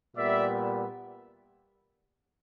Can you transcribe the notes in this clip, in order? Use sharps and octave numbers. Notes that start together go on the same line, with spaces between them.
A#2 G3 B3 D5 E5